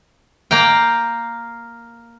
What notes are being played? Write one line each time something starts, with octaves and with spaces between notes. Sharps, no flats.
A#3 F5 G5